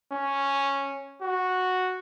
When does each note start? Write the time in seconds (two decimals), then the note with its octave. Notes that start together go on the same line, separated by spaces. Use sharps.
0.13 C#4
1.22 F#4